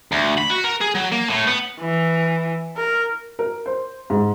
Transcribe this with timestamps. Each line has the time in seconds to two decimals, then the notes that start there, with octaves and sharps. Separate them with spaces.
0.12 D2
0.38 B5
0.50 F#4
0.64 A#4
0.81 G#4
0.95 F#3
1.12 A#3
1.30 A2
1.48 B3
1.80 E3
2.77 A#4
3.39 A#4
3.66 C5
4.10 G#2